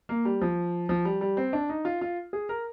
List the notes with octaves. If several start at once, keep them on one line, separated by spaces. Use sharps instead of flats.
A#3
G3
F3
F3
G3
G3
C4
D4
D#4
F4
F4
G#4
A#4